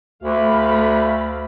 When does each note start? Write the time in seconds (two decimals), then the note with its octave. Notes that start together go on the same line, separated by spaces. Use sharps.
0.23 D2 A3 F5 B5